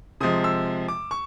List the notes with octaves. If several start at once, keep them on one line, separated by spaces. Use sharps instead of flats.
C3 F3 G#3 D#6
E6
D6
C#6